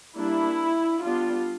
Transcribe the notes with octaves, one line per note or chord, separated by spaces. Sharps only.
G3 A#3 D4 E4
G3 B3 D4 F4